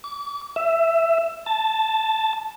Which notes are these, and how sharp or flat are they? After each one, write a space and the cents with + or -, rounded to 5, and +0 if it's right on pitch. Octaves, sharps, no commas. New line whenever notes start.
D6 -45
E5 +10
A5 +0